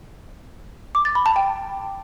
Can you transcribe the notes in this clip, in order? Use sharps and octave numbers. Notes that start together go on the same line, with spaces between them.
D6
A6
B5
A5
G5